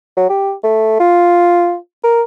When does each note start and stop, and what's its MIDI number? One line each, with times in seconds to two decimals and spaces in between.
0.17 0.29 54
0.30 0.52 67
0.64 0.96 57
1.00 1.76 65
2.04 2.22 70